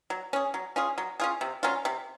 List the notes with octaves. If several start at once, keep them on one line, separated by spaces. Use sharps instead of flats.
F#3
C#4 G#4
F#3
C#4 F4 G#4
F#3
C#4 F4 G#4
C3
F#3 C#4 F4
C3